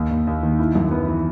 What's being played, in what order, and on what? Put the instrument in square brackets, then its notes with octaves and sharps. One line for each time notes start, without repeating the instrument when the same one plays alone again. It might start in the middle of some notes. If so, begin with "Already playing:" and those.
Already playing: [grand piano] D#2
D#2
D#2
D#3
E4
F#2
B3
E3